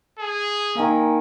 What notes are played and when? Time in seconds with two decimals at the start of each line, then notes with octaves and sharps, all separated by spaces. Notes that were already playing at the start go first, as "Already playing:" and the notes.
0.19 G#4
0.75 D#3 A#3 A#4 F5 G#5